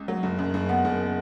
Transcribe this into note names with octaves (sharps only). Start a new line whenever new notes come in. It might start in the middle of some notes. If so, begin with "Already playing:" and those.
Already playing: C#2
F#3
F#1
F#2
F#1
B3
F#1